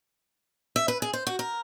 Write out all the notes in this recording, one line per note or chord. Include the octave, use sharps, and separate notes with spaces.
E5
B4
G#4
C5
F#4
A#4